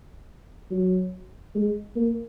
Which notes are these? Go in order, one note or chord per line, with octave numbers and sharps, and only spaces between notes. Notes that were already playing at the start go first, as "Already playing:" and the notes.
F#3
G#3
A#3